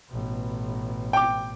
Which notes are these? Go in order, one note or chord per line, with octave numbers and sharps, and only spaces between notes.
A1 B2
G5 D6